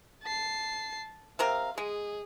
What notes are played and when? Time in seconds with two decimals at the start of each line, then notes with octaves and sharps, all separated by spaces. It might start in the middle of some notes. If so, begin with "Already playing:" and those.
0.23 A5 C7
1.39 C3 C4 A#4 F5
1.78 G#3 G#4